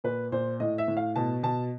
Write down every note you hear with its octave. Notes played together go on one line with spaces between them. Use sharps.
A#2 B4
A#2 C5
A2 D#5
E5
A2
F5
B2 A5
B2 A5